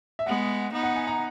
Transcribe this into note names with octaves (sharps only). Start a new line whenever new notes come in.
E5
G#3 B3 F#5
B3 D#4
F#5
G#5
A#5